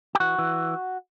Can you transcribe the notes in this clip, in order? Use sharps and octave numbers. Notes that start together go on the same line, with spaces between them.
G4
E3 F#4
E3